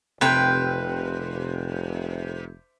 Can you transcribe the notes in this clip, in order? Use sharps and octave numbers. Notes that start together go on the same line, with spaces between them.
F1 C3 B4 G5